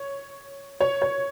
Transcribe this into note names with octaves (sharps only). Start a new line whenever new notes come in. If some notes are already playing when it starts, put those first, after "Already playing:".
Already playing: C#5
C#5
C#5